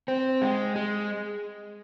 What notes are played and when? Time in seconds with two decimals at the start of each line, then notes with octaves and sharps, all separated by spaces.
0.08 C4
0.42 G#3
0.76 G#3